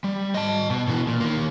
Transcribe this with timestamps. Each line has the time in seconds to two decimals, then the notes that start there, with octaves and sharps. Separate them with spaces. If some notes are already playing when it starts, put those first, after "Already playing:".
0.04 G3
0.34 D#5 A5
0.70 B2
0.88 B2 E3
1.07 A#2
1.20 D#3 A#3